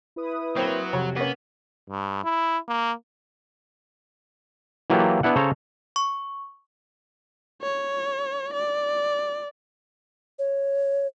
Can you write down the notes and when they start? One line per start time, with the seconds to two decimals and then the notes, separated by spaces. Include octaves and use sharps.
0.16 E4 B4 D#6
0.56 F#3 A#3 C4 C5
0.93 F2 C3 F#4 C#5
1.16 A#3 B3 C#4
1.90 G2
2.24 E4
2.68 A#3
4.90 E3 F#3 A#3 F4 G4 A4
5.23 B3 D4 E4 F#5
5.36 C#3 A4 C5 C#5 A#5
5.96 C#6
7.62 C#5
8.53 D5
10.39 C#5